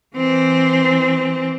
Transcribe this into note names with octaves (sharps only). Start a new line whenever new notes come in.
E3 C4